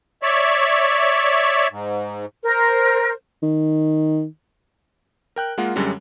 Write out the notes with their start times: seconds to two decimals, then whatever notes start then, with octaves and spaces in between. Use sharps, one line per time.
0.23 C#5 D5 E5
1.71 G#2
2.43 A#4 C5
3.42 D#3
5.36 A#4 G5 F#6
5.58 G#3 A#3 F4 F#5
5.76 F#2 D3 G3 G#3 C#4